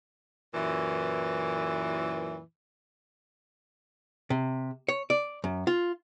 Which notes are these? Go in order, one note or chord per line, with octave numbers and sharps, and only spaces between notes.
F#2 A#2 E3
C3
C#5
D5
F#2
F4